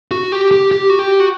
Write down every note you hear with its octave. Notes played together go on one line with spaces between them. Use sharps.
F#4
G4
G4
G4
F#4
G4
F#4